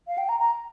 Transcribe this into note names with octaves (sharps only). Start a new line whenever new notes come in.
F5
G5
A#5
A#5